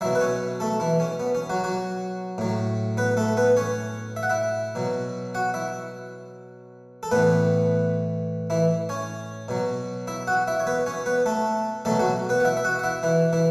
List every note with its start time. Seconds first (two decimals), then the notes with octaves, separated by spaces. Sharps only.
0.01 B2 F#3 E4 E5
0.15 B4
0.21 C#4 C#5
0.60 A3 A4
0.80 E3 E4
1.00 C#4
1.20 B3
1.35 C#4
1.50 F#3 F#4
1.64 F#3 F#4
2.38 A2 F#3
2.97 B3 B4
3.17 A3 A4
3.37 B3 B4
3.57 C#4 C#5
4.17 E5
4.23 F#5
4.30 E4 E5
4.75 B2 F#3
5.35 F#4 F#5
5.54 E4 E5
7.03 A4
7.11 A2 E3 B3 B4
8.50 E3 E4
8.89 C#4 C#5
9.48 B2 F#3
10.07 E4 E5
10.27 F#4 F#5
10.47 E4 E5
10.60 C#5
10.67 B3 B4
10.86 C#4 C#5
11.06 B3 B4
11.26 A3 A4
11.85 B2 F#3 A3 A4
12.00 F#3 F#4
12.29 B3 B4
12.40 F#5
12.44 E4 E5
12.57 E5
12.64 F#4 F#5
12.79 F#5
12.83 E4 E5
13.03 E3 E4
13.33 E3 E4